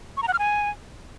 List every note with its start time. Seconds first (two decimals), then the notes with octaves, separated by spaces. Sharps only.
0.17 C#6
0.22 A#5
0.28 F#5
0.33 F6
0.39 G#5